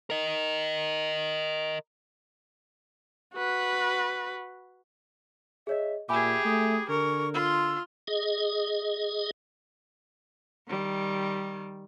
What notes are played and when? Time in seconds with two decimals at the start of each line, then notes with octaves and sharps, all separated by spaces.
0.10 A#4 D#5
3.34 F#4 B4
5.67 G#4 C#5 D#5 E5
6.09 A#2 G4 G#4 E5 G#5 B5 D6
6.45 A3 D#6
6.89 D3 A#4 C#6
7.34 F4 C6 E6
8.08 G#4 D#5
10.68 D#3 G3